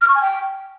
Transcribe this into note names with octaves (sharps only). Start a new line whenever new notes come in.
F6
C#6
G#5
G5